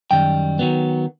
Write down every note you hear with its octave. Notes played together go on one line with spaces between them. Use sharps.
F#2 D#3 G3 G5
D#3 F#3 B3